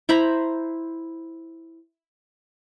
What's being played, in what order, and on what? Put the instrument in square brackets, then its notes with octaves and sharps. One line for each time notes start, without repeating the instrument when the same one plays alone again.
[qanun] E4 C5 A#5 B5